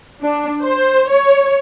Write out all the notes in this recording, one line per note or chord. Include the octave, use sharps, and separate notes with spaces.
D4
C5
C#5